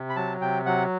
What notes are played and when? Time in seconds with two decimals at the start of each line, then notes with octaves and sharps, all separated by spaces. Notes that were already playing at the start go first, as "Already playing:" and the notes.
Already playing: C3
0.10 B5
0.16 F#3 A5
0.41 C3 G5
0.66 F#3 F#5